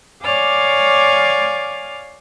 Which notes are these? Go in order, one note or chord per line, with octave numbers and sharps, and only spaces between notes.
C#5 D5 F5 G#5 D6 F6